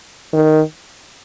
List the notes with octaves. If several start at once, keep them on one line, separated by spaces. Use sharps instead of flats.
D#3